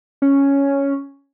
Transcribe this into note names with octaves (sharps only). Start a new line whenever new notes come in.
C#4